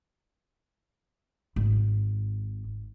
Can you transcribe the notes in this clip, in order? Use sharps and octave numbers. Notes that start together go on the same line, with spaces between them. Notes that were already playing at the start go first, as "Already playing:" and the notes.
G#1